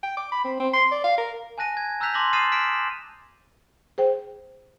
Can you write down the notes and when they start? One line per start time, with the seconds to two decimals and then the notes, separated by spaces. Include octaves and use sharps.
0.03 G5
0.17 D6
0.32 B5
0.44 C4
0.60 C4
0.74 C6
0.91 D5
1.04 F5
1.18 A#4
1.58 G#5 A5 F#6 A#6 D#7
1.77 G#6
2.00 A#5 E6 F#6 G6 B6 F7
2.14 A5 C6 D6 A#6 F#7
2.33 D#6 F6 A6 C7 D#7 E7
2.52 F6 B6 D7 E7
3.98 G#4 C5 G5